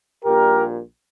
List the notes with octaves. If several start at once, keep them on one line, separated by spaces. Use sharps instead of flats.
A#1 A#2 G3 G4 A#4